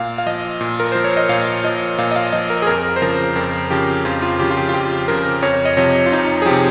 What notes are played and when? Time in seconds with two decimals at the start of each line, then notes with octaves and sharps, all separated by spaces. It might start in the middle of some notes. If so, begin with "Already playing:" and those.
Already playing: A#2 F5
0.18 F5
0.26 F3 D#5
0.61 A#2
0.80 A#4
0.92 F3 C5
1.04 C#5
1.17 D#5
1.29 A#2 F5
1.64 F3 D#5
1.98 A#2 F5
2.11 D#5
2.16 F5
2.33 F3 D#5
2.50 A#4
2.62 G#4
2.67 F2 A#4
2.96 C5
3.02 C#3 F3 A#4
3.36 F2 A#4
3.70 C#3 F3 G4
4.05 F2 F4
4.22 F4
4.39 C#3 F3 G4
4.50 F4
4.57 G4
4.69 F4
4.74 F2 G4
5.08 C#3 F3 A#4
5.42 F2 C#5
5.65 D#5
5.77 C3 F3 C#5
6.06 F4
6.12 F2 D#4
6.42 G#4
6.46 C3 F3 G4